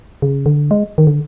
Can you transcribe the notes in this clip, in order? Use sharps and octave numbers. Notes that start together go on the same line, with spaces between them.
C#3
D3
G#3
D#3
D3